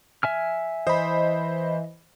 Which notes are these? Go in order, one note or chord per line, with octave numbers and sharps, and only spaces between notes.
E5 G#5 F6
E3 C5 D#5 B5